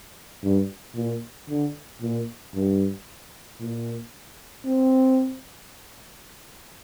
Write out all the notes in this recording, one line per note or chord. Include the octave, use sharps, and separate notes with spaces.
G2
A#2
D3
A#2
G2
A#2
C4